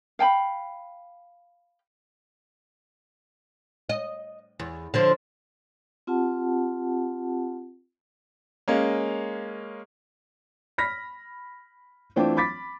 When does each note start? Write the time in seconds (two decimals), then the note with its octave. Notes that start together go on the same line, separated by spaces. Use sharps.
0.19 F5 G5 G#5 B5
3.89 D#5
4.60 E2
4.94 D3 F3 C5
6.07 C4 F4 G4 F#5 A5
8.68 G#3 A#3 C#4
10.78 B5 F6 A#6 B6
12.16 E3 A3 C4 D4 F4 G5
12.37 B5 D6 A6 B6